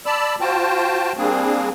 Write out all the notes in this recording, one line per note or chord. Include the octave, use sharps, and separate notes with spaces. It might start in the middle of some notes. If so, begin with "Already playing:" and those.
D5 A5 B5 E6
F4 F#4 C5 G5 A5
G3 A#3 C4 D4 G#4